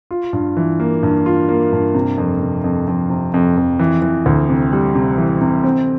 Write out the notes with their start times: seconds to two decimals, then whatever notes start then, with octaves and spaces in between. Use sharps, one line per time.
0.11 F4
0.33 G2
0.57 E3
0.80 A#3
1.03 G2
1.26 F4
1.49 A#3
1.72 G2
1.94 C3
2.18 F2
2.42 C3
2.64 F2
2.87 F2
3.10 C3
3.34 F2
3.57 F2
3.79 E3
4.02 E3
4.26 D2
4.49 C3
4.72 G3
4.95 C3
5.18 E3
5.41 C3
5.64 C4